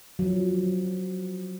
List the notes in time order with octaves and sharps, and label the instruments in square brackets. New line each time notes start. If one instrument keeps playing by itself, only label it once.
[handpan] F3 F#3